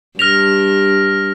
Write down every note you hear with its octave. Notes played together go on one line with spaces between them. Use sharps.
G2 F6 A#6 B6 F7